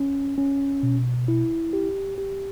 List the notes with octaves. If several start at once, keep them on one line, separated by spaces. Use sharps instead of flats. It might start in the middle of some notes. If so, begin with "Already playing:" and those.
Already playing: C#4
C#4
B2
E4
G4
G4